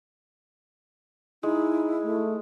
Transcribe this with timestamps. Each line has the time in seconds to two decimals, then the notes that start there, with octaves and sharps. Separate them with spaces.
1.43 G#3 D#4 E4
2.03 A3